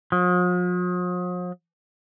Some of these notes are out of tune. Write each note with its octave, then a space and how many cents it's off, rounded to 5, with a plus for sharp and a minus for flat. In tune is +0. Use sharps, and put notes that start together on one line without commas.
F3 +45